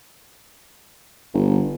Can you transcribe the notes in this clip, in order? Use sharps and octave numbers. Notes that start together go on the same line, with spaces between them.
G1